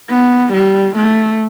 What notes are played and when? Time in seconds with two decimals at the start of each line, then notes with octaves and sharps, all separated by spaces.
0.10 B3
0.53 G3
0.96 A3